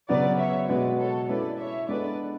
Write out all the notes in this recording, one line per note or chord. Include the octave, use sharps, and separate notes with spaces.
C#3 F#3 B3 F#4 B4 D5
C#5 E5
B2 G#3 B3 F#4 B4 D5
A4 C#5
G#3 C#4 E4 A4 B4 D5
C#5 E5
G#3 B3 D4 A4 B4 D5